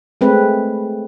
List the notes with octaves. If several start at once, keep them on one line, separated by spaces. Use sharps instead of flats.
G#3 A3 C4 B4